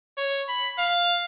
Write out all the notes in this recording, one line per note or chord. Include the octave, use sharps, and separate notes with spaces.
C#5
B5
F5